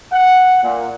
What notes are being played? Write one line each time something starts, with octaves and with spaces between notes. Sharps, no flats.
F#5
A#2